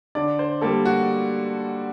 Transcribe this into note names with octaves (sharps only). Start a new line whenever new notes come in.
D3 D5
C5
G3 A#3 A4
F#4